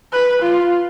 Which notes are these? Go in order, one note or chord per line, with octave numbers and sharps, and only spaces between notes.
B4
F4